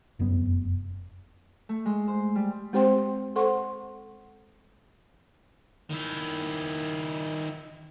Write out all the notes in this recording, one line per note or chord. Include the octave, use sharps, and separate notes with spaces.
F1 F#2 B3
A3
G#3
C5
G3
G#3 C4 G4 C5 G5 C6
A4 C5 F#5 C6 C#6
D#3 E4